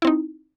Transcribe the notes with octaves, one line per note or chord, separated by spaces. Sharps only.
C4 D#4 E4